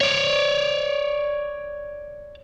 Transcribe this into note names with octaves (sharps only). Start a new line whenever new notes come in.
C#5 D5